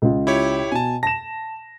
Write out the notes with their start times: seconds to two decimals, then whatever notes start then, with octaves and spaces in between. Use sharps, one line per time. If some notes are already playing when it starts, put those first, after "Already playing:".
0.02 C#2 F4
0.27 E4 G4 C#5
0.72 B2 G#5 A5
1.03 A5 A#6 E7